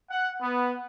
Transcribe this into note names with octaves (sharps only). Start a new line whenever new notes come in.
F#5
B3